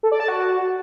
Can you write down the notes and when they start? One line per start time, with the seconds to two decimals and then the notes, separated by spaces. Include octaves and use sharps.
0.03 A4
0.12 D5
0.20 A5
0.28 F#4